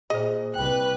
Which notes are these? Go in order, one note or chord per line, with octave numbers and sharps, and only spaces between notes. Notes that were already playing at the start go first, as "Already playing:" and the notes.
A#2 G#4 C5 D#5
C2 B4 G5 F#6